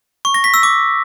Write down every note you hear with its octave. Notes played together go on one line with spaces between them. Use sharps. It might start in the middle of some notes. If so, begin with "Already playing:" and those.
C#6
A#6
B6
E6
D6